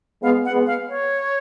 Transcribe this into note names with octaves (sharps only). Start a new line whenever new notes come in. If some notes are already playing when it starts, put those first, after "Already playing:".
G#3 B3 F5
F#5
G#3 B3
F5
C#5